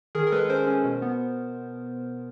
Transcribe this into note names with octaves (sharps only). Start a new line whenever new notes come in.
D#3 G#4 A#4
A#4
G#3 A4 B4
C#4 A#4 C5
C#4
B2
B3